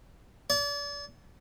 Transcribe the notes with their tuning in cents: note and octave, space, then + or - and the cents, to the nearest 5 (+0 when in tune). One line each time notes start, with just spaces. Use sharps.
D5 -40